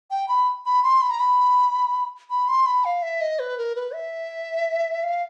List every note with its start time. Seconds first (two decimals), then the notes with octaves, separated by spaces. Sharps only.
0.11 G5
0.28 B5
0.66 B5
0.83 C6
1.02 B5
1.10 A#5
1.20 B5
2.30 B5
2.48 C6
2.66 B5
2.85 F5
3.02 E5
3.21 D#5
3.39 B4
3.58 A#4
3.76 B4
3.94 E5
5.03 F5